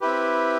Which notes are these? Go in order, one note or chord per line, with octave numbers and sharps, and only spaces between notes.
C4 E4 G4 B4